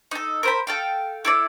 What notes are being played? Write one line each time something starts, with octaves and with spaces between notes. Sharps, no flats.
D#4 A4
A#4 C5 B5
A4 F5 G5
E4 A4 D5